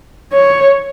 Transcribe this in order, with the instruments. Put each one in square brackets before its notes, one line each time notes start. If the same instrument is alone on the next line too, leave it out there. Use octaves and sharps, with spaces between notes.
[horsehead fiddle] C#5